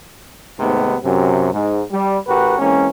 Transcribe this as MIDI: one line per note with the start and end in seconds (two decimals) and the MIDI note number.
0.60 0.96 39
0.60 0.96 44
0.60 0.96 48
0.60 0.96 56
0.60 0.96 57
0.60 0.96 59
1.03 1.48 42
1.03 1.48 48
1.53 1.81 44
1.91 2.17 55
2.27 2.58 33
2.27 2.58 45
2.27 2.58 66
2.27 2.58 67
2.27 2.58 70
2.27 2.58 71
2.59 2.87 52
2.59 2.87 56
2.59 2.87 58
2.59 2.87 60
2.59 2.87 61